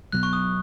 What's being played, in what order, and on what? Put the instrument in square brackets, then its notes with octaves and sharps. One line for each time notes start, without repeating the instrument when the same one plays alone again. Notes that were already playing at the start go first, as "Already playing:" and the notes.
[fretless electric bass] B1 B2 F#3 B3 [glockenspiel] F#6
[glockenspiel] C#6
D#6